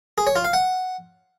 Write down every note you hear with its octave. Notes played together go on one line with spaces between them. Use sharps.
G#4
C#5
F4
F5
F#5